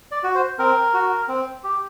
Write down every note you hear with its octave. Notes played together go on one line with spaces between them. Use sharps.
D5
F#4
C5
C4 A#4
F#4
C4
G4